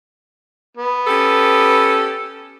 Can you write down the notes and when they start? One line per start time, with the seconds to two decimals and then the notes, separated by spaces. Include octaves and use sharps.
0.77 B3
1.07 C#4 G4 A4